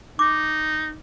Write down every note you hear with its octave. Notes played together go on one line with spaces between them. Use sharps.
D#4 D6